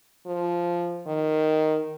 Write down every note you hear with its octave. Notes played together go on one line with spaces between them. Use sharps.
F3
D#3